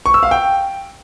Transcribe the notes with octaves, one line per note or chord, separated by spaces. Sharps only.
C#6
E6
F5
G5